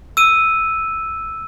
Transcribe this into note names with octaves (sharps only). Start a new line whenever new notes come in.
E6 D#7